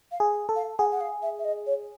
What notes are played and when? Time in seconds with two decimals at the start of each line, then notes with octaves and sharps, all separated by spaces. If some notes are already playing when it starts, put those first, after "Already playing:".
0.12 F5
0.20 G#4
0.49 A4
0.56 F5
0.79 G#4 F#5
0.91 F#5
1.01 F5
1.22 E5
1.39 E5
1.45 D#5
1.66 C#5